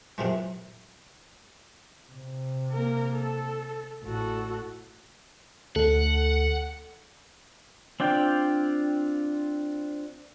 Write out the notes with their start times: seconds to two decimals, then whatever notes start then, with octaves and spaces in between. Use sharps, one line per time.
0.18 F#2 C3 E3 F3 G#3
2.11 C3
2.72 A#3 A#4
3.16 A4
4.04 A1 F#4 A4
5.76 D2 A4 F#5
8.00 C4 D4 F4 G5